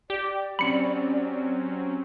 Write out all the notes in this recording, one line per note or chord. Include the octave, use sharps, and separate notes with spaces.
G4 D5
F#3 C4 C#4 B5 C#7